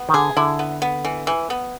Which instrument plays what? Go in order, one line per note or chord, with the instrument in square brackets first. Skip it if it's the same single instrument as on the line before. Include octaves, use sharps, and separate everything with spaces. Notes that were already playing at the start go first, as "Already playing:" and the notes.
Already playing: [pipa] B3
[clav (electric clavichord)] D#3
[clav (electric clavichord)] D3 [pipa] G#4
[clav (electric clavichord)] D3 [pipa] E4
[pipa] B3
B3
E3
E3
B3